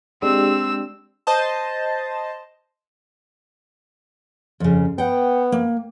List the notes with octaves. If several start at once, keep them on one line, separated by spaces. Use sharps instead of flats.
G#3 C4 D4 G4 E6
C5 D#5 A5
F2 C#3
B3 F#5 G5
A#3